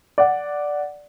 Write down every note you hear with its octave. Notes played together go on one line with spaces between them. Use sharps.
D5 F#5